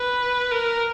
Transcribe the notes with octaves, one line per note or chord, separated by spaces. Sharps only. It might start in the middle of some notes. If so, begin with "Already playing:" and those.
Already playing: B4
A#4